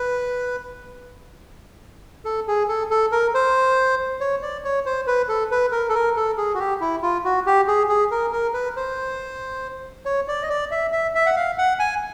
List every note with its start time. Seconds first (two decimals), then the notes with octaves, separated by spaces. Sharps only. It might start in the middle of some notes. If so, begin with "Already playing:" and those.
Already playing: B4
2.25 A4
2.48 G#4
2.68 A4
2.91 A4
3.12 A#4
3.35 C5
4.21 C#5
4.42 D5
4.64 C#5
4.86 C5
5.07 B4
5.28 A4
5.51 B4
5.72 A#4
5.89 A4
5.94 A#4
6.16 A4
6.37 G#4
6.54 F#4
6.59 G4
6.81 E4
7.02 F4
7.25 F#4
7.46 G4
7.68 G#4
7.89 G#4
8.11 A#4
8.32 A#4
8.54 B4
8.76 C5
10.05 C#5
10.28 D5
10.43 D#5
10.50 D5
10.71 E5
10.92 E5
11.15 E5
11.26 F#5
11.36 F5
11.58 F#5
11.79 G#5